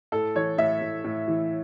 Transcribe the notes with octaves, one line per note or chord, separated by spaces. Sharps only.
A2 A4
E3 C#5
A2 E5
A2
A2
E3